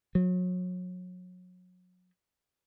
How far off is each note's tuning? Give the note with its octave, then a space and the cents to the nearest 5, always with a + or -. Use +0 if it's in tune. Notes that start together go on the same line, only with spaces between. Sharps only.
F#3 -30